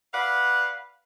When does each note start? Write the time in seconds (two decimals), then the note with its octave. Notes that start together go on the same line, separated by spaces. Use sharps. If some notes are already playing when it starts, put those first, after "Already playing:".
0.12 B4 D5 F5 F#5